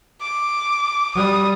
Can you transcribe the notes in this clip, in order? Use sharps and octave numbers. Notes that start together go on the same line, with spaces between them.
D6
G3 D#6